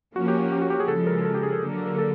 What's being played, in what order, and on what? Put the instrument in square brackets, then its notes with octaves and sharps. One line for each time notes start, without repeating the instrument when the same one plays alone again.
[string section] F3 A#3 C#4 [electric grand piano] F#4
[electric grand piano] G4
G4
F#4
G4
G#4
[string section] C#3 F3 G#3 [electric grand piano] A4
[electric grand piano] A#4
G#4
A4
G4
G#4
A4
[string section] D3 F#3 A#3
[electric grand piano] A#4
A4